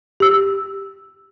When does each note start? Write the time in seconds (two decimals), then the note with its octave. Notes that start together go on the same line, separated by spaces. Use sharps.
0.20 G4 E6